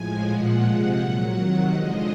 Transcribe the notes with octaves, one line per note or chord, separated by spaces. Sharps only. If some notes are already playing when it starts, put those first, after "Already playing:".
Already playing: A2 F3 G#3 G#5
A#2 F3 G#3 F#5
C3 F3 G#3 F#5
A#2 F#3
C3 D#3 F#3
D3 F3 G#3 D#5